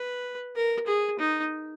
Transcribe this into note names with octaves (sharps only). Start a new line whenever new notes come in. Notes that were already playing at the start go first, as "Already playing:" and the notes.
Already playing: B4
A#4
G#4
D#4